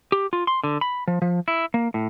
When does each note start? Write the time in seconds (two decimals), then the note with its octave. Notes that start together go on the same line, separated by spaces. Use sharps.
0.12 G4
0.33 F4
0.47 C6
0.64 D3
0.81 B5
1.08 F3
1.22 F3
1.48 E4
1.74 A#3
1.94 A2